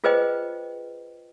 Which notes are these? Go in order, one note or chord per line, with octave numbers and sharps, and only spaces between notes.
F4 G#4 B4 C5 D#5 G5